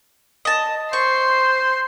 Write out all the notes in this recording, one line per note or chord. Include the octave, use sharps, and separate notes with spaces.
D#5 A5
C5 C6 C#6